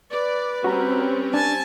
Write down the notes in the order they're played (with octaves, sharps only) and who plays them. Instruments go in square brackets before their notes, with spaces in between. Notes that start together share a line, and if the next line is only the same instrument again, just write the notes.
[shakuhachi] B4 [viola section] D5
[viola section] G3 C4 C#4 [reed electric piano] F#4 A#5
[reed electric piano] D4 [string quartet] G#5 A5